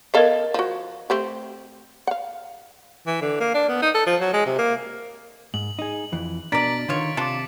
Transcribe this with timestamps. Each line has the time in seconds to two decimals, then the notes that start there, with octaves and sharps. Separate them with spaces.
0.14 B3 A4 A#4 D#5 F5
0.54 F3 F#4
1.10 A3 C4 G4
2.07 F5 F#5
3.07 E3
3.21 D3
3.40 A#3
3.54 D4
3.69 B3
3.82 D#4
3.94 A4
4.06 F3
4.21 F#3
4.34 G#3
4.46 C3
4.58 A#3
5.54 G#2 F#7
5.79 D#4 G#4
6.13 F2 E3
6.52 B2 D4 A#4 D5 A6 B6 D7
6.88 B2 D3 D#3 F4 C#5
7.17 C3 D4 F4 A5 D6 C#7